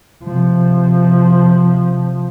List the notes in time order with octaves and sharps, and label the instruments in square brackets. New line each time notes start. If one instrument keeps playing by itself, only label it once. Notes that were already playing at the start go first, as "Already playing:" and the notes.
[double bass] C3 F3